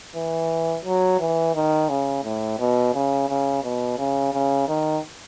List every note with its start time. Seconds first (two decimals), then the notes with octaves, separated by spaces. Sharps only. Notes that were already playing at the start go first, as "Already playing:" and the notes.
0.15 E3
0.85 F#3
1.20 E3
1.55 D#3
1.89 C#3
2.24 A2
2.59 B2
2.94 C#3
3.29 C#3
3.64 B2
3.98 C#3
4.33 C#3
4.68 D#3